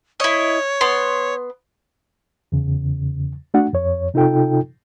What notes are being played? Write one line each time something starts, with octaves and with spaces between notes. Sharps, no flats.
E4 C#5 D#5
B3 C6
E2 C#3
A3 D4 F#4 F#5
F2 C#5
C3 D#4 F4 A4 G5